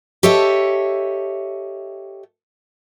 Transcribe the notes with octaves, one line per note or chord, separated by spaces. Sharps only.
G4 A4 C#5 D#5 E5